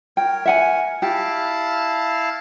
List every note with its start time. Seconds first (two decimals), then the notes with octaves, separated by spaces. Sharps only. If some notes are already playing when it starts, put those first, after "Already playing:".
0.17 A#4 C#5 G5
0.45 E5 F#5 G#5
1.02 E4 G4 F5 A5